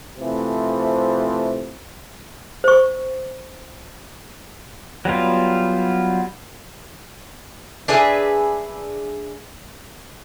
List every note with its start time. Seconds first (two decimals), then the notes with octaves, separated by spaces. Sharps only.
0.18 C3 E3 F3 A3
2.64 C5 C#6
5.05 F#3 G3 B3 F4
7.88 D4 G#4 B4 E5